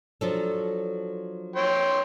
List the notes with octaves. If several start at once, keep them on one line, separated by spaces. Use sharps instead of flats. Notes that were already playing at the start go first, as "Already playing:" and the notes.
F3 F#3 D4 A4
C#5 G5 C6